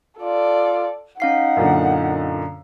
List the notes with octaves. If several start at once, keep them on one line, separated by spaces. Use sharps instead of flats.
F4 A4 D5
C#4 D#4 F5 F#5 C7
F#2 A#2 D3